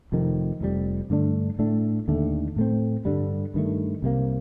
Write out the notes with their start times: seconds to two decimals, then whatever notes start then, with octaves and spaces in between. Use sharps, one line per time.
0.12 F1 F2 C3 D#3
0.61 F1 F2 C3 G3
1.10 G2 D3 A3 D4
1.59 A2 A3 D4
2.08 D#2 D3 A3
2.56 A2 A3 C4
3.05 G2 D3 G3
3.54 G2 D#3 A3
4.02 C2 C3 D#3 A#3